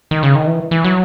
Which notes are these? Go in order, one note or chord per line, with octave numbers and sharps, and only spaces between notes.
D#3
C#3
D#3
E3
E3
F#3